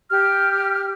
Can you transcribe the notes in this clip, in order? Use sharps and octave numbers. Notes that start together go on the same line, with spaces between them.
G4 F6